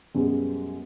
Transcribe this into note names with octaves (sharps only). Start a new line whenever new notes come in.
F#2 B2 G3 G#3 B3